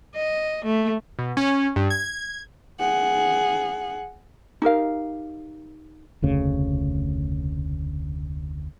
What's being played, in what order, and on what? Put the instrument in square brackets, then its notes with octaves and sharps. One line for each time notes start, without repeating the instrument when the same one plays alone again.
[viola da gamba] D#5
A3
[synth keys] B2
C#4
G2
G#6
[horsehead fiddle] G#4 F#5
[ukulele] D#4 G4 A#4 F5
[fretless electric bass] F1 D2 C#3